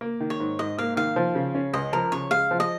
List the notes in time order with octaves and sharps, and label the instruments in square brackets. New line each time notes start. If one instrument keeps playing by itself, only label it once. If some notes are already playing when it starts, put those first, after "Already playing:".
[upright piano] A#3
D#3
[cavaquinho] C#5
[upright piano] G#2
[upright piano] G#2 [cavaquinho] D#5
[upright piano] A#3 [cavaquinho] F5
[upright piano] D#3 [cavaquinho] F5
[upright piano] F3
C#3
C#4
[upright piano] C#2 [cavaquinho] D#5
[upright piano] F3 [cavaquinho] A#4
[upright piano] C#3 [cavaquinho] C#5
[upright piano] G#3 [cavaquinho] F5
[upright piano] F3
[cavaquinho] D#5